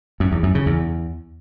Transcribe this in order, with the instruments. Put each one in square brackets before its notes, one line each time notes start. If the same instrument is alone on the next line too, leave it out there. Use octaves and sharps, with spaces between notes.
[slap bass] F#2
E2
F#2
C#3
E2